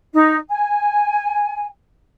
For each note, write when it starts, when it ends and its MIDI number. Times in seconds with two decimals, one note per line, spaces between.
0.13 0.35 63
0.49 1.63 80